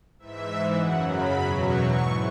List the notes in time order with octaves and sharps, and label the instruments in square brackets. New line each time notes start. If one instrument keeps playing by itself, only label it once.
[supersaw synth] G#2 E3 E5
F#2 C#3 F#3 F#5
B5
E2 B2 F#3
C#6
G#2 E3 C#6